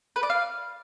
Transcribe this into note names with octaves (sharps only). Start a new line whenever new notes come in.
B4
D5
F5